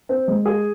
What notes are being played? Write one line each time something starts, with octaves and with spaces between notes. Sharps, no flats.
C4
G#3
G#4